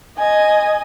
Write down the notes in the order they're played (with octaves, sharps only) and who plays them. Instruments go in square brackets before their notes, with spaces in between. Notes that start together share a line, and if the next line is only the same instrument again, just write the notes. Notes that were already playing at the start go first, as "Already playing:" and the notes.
[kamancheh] D#5 G#5